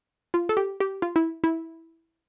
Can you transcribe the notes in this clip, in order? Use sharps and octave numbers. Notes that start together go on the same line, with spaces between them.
F4
A4
G4
G4
F4
E4
E4